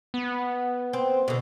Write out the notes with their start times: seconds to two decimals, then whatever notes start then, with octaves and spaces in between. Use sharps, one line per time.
0.14 B3
0.93 C4
1.28 B2 D3